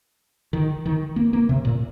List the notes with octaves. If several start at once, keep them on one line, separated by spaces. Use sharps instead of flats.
D#3
D#3
A#3
A#3
C3
A#2